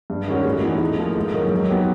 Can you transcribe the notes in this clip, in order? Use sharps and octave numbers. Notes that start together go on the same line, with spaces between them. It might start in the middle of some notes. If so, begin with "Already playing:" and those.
G2
D#3 G#3 C#4 F#4
A2
E3 G#3 B3 D#4
A2
F3 A#3
G#2
D#3 F#3 A#3
F#3
B3 D#4 G4